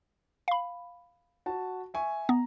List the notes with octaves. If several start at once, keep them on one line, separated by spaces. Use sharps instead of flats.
F5 B5
F#4 A5
E5 G#5 C#6
B3 A#5